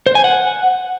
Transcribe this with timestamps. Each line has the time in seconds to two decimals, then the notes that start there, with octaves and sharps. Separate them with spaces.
0.06 C5
0.15 G#5
0.24 F#5